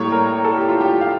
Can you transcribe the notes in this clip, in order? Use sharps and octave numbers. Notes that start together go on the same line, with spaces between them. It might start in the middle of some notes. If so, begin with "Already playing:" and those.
Already playing: A2 G3 A#3 C#5
A#4
A4
G4
F4
G4
F5